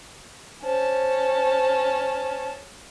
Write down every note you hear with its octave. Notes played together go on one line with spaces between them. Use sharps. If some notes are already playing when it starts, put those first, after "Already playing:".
C#4 C5 A5